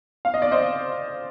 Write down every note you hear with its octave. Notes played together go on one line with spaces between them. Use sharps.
F5
D#5
D5
C5 D#5